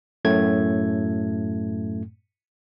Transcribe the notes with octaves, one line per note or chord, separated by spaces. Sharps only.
F#2 A2 A3 G#6